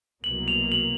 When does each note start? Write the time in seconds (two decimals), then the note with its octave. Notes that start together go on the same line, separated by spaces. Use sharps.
0.23 C2 B2 F#3 A#3 F#7
0.48 F7
0.72 F#7